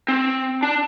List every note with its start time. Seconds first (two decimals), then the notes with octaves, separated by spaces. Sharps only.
0.08 C4
0.63 D4